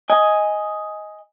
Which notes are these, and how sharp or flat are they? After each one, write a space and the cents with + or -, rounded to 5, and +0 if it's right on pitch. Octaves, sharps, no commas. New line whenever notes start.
D#5 +10 G#5 +0